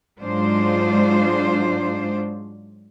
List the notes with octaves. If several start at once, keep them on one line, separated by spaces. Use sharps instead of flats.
G#2 F#3 G#3 D4 F4 C5